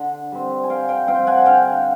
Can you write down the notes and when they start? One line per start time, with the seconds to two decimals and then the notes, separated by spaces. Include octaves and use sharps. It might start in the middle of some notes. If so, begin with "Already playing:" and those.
Already playing: D3
0.32 G3 C4
0.63 G#5
0.70 D3 F5 G5
0.89 F5 G5
1.07 G3 C4 F5 G5
1.27 F#5 G#5
1.46 D3 F5 G5